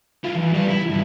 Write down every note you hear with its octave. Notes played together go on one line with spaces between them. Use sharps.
E4 F4
E2
G3 B4
E4
G2 D#3